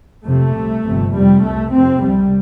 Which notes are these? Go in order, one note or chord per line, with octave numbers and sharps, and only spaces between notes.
F1 F2 C3 A3
C2 C3
G1 F2 C3
F1 F2 C3 G3
C2 C3 A3
F1 F2 C3 C4
C2 C3 G3